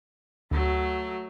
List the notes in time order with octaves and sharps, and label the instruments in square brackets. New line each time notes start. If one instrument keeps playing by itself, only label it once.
[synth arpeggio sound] D2 [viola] F#3 A3